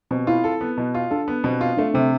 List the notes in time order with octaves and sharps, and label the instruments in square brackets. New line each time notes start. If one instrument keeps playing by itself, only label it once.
[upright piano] B2 [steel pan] C4
[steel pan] E4 [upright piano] F4
[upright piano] A4
B3
B2
F4
[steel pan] D4 [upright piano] A4
[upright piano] B3
[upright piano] B2 [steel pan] C4
[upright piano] F4
[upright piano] A3 [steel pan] D4
[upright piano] C3 [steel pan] C4